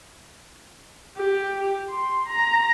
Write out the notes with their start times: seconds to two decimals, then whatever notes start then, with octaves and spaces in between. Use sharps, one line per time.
1.17 G4
1.90 C6
2.29 A#5